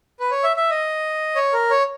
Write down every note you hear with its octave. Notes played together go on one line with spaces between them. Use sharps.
B4
C#5
E5
E5
D#5
C#5
A#4
C#5